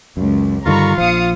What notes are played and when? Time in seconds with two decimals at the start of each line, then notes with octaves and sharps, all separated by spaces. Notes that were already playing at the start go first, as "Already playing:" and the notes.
0.17 C#2 F#2
0.66 G2 D3 D#3 F4 A#5 B5 C#6
0.98 A#1 F3 F5 D#6 C#7